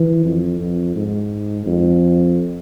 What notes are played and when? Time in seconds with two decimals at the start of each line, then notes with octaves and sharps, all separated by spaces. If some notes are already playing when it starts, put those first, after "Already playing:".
Already playing: E3
0.25 F2
0.60 F2
0.95 G#2
1.66 F2